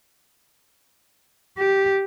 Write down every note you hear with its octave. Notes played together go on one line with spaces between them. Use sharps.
G4